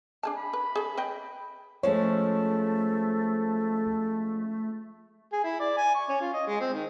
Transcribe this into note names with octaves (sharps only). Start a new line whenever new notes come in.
D4 G#4 A5
B5
B4
G#4 A4
B4 D#5 G5
F3 G#3 A3 C#4 C#5
G#4
E4
D5
G#5
C#6
C#4
F4
D#5
G#3
C4
D#3